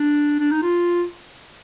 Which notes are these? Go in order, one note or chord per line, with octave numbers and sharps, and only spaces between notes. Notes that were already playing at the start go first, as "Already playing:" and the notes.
Already playing: D4
D4
D#4
F4